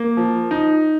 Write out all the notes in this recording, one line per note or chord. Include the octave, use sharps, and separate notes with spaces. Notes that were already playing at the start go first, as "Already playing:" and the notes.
Already playing: A#3
F3
D#4